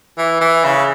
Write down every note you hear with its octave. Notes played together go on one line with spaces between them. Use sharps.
E3
E3
C#3